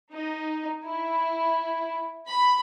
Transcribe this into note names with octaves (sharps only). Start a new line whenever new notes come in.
D#4
E4
B5